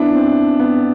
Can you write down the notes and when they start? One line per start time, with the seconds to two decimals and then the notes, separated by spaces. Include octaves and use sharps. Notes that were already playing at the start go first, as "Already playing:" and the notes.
Already playing: B3 D4 E4
0.15 C4
0.59 B3